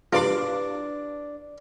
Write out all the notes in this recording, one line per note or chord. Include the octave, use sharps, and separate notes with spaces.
D4 E4 F4 G4 B4 D5 C6